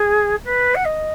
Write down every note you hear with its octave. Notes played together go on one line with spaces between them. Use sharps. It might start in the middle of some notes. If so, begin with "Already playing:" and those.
Already playing: G#4
B4
F#5
D#5